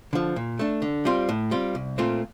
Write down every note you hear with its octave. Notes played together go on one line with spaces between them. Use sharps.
D3 F3
A#2
A3 D4
D3
G3 C4 F4
A2
G3 C4 F4
C2
A#2 A3 C4 F4